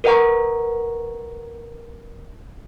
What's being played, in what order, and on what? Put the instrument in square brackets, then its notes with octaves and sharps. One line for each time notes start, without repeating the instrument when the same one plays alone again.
[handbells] A#4 B4 D#5 F#5 A#5 C#6